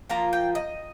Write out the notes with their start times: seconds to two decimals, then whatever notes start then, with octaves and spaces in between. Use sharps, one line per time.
0.09 F3 A#3 F4 A#5
0.33 G5
0.55 D#5